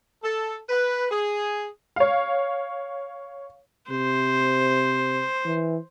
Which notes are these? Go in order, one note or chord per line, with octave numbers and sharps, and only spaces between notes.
A4
B4
G#4
C#5 F5
C3 C5
E3